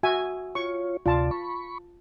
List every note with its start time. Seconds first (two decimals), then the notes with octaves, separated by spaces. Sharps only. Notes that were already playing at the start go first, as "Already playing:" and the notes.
0.03 F#4 E5 G#5
0.55 F4 C#5 C#6
1.06 D2 C3 F4 D5 A5
1.31 B5 C#6